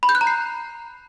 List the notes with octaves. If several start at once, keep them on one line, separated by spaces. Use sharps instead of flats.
B5
G6
F#6
A#5
C7